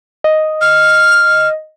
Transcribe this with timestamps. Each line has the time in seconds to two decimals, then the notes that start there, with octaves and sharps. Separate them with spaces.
0.24 D#5
0.61 F6